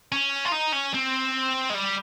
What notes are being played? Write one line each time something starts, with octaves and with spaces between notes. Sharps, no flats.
C#4
F4
D#4
C#4
C4
G#3
G3